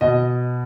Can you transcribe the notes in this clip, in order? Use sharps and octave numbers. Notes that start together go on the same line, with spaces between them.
B2 D#5